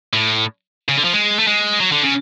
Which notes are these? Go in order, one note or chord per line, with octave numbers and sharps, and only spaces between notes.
A2
C#3
D3
F3
G#3
A3
G#3
F#3
D3
C#3